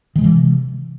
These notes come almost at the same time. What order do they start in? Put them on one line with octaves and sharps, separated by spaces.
D#3 G#3 C3 E3